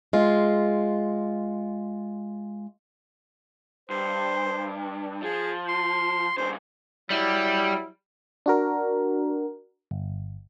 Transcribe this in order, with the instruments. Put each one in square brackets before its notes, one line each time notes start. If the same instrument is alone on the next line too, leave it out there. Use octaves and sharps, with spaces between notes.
[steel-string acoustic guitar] G#3 F4
[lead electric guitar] G2 [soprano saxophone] C5
[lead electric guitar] F3 [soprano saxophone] G#4
[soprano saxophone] C6
[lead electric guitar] G2 C#3 [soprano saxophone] C5
[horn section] F#3 E4 [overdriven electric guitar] G3
[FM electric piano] D4 F#4 A#4
G1